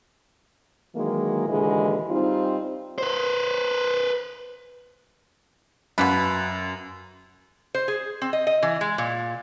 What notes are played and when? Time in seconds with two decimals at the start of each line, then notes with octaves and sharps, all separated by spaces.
0.95 D#3 E3 F#3 G#3 A#3
1.47 D#2 A#2 D3 E3 G#3
2.09 G3 C4 D#4 F4
2.98 B4 C5
5.98 F#2 B2 A#3 B4
7.75 C5
7.88 G#4
8.22 C4
8.33 D#5
8.47 D#5
8.63 E3
8.81 G#3
8.98 A#2